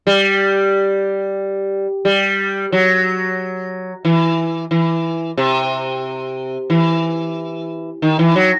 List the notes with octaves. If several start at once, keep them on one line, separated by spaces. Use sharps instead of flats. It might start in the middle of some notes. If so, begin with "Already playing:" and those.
G3
G3
F#3
E3
E3
C3
E3
D#3
E3
F#3